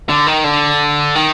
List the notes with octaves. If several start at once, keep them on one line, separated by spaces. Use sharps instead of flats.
D3
D#3
D3
D#3